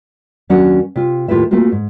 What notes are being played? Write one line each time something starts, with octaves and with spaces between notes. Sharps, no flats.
D#2 F#3 C#4 D4 F#4 F#5
C3 F4
D#2 A2 F4 G4 B4 E5
A3 A#3 C4 F4 F#4
G#2